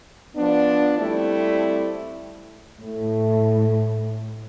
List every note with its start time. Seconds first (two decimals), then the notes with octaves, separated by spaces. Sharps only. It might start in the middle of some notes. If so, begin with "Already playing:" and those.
0.36 F3 B3 D4
0.98 G3 A3 C4 E4
2.81 A2 A3